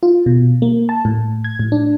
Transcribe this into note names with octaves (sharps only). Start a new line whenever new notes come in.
F4
B2
A#3
A5
A2
G#6
A2
D4